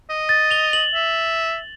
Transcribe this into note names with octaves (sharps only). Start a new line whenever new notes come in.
D#5
A6
F7 G7
F#7
E5